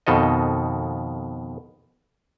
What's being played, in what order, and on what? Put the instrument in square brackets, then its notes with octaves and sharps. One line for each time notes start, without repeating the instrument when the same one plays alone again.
[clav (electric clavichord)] F2 B2 D#3 A4 D#5